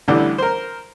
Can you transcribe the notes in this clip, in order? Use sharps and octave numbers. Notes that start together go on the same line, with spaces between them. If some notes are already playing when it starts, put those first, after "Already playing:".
A1 D3 E3 G3
A#4 C5